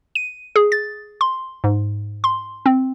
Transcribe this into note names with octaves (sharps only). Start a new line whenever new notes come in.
D#7
G#4
A6
C6
G#2
C6
C4